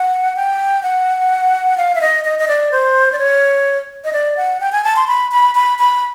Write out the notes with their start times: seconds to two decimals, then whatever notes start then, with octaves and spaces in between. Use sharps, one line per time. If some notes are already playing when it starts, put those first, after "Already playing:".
Already playing: F#5
0.36 G5
0.83 F#5
1.77 F5
1.95 E5
2.01 D#5
2.25 D#5
2.39 D#5
2.48 D5
2.72 C5
3.12 D5
3.19 C#5
4.05 D#5
4.13 D5
4.37 F#5
4.61 G5
4.72 G#5
4.84 A5
4.96 C6
5.07 B5
5.31 B5
5.55 B5
5.79 B5